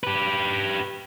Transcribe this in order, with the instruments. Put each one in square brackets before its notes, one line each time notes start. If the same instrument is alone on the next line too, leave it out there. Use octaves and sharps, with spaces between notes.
[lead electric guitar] G4 B4